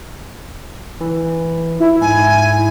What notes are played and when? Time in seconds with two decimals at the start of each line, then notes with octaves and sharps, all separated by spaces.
1.01 E3
1.80 E4
2.01 G#2 G#5